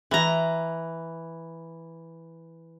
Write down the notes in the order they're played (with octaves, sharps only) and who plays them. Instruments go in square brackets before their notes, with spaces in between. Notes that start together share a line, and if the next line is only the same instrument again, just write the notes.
[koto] E3 A#5